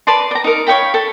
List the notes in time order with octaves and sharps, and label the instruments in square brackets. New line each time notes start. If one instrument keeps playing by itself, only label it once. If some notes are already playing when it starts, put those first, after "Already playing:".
[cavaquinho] B4 D5 A5 C6
D5 A#5
D#4 A#4
C#5 F5 G5 B5
A4